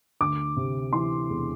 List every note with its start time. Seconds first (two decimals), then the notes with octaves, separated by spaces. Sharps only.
0.21 D2 D6
0.57 C3
0.93 E3 C6
1.29 E1